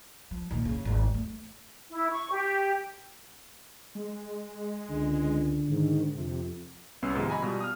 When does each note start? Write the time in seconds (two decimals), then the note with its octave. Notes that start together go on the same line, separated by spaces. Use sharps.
0.31 F3
0.51 A#2 D#3
0.65 F#1 C#3
0.85 G#1 E2
1.14 A3
1.92 E4
2.11 C#6
2.31 G4
3.95 G#3
4.90 C#2 D3
5.69 G#2 D#3
6.16 F2 C3
7.02 C2 B3 C#4 E6 C7
7.15 G#2 C3 D#3 F3 G#3
7.29 D#5 G#5 A#5 B5 C#6
7.42 B2 G3 B3 F4
7.61 D#6 F6